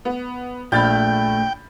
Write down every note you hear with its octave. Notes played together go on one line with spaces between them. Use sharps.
B3
A#1 A3 G5 B5 F6 G6 A6